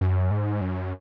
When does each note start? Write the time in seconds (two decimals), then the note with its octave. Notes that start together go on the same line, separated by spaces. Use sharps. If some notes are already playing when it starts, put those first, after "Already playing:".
0.01 F#2
0.31 G#2
0.61 F#2